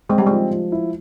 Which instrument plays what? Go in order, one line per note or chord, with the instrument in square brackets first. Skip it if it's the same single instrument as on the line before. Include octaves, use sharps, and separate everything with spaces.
[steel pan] G#3 [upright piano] C4
[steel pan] G3
[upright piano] F3 [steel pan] G#3
[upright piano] F3
E4